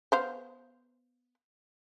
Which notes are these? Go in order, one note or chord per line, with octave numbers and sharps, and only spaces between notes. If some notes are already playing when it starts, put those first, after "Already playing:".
B3 C5 F5